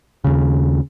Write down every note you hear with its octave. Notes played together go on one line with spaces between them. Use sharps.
D#2 C#3